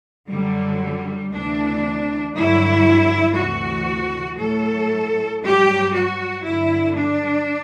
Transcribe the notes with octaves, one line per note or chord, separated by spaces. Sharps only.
F#2 D3 F#3 G3
G3
D2 C3 E3 D4
G2 D3 F#3 E4
D2 C3 E3 F#4
A2 F#3 A4
G2 F#3 G4
F#4
G2 D3 F#3 E4
D4